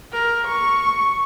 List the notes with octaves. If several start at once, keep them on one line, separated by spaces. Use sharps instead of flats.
A#4
C#6